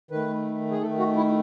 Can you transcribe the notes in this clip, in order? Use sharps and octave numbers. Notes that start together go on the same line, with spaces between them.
D#3 A3 B4
G#4
D#3 A3 A4
F#4
E4